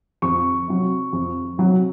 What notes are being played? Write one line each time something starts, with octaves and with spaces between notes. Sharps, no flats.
F2 C#6
C3 F#3
F2
C3 F#3